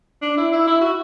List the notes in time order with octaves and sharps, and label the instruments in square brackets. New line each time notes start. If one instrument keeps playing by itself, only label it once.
[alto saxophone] D4
E4
E4
E4
F#4